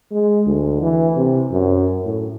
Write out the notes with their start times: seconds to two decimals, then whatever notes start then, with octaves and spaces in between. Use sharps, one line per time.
0.11 G#3
0.46 D2
0.81 E3
1.16 C3
1.51 F#2
2.05 A2